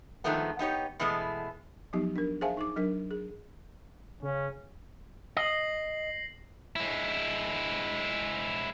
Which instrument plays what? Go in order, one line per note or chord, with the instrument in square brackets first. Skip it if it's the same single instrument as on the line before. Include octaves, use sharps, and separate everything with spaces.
[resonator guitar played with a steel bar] G2 D#3 F3 G#3 A3 B3
B3 D#4 G4 C#5
B2 E3 G#3 A3 B3
[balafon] F3 F#3 B3 D#4 G4
D4 A#4
G#4 C5 E5 F5 G#5 A5
D#4 G#4 D6
F#3 D4 A#4
G#4
[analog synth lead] C#3 [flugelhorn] C#4
[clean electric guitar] D#5 [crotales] A#6 C7 F#7
[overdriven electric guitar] G#3 E4